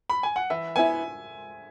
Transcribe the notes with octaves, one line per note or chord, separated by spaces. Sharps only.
B5
G#5
F#5
E3 E5
B3 E4 G#5